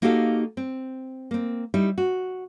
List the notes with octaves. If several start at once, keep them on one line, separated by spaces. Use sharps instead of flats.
A#3 D#4 F#4 G4 A4 F5
C4
A#3 C4
G3 D#4 E4
F#4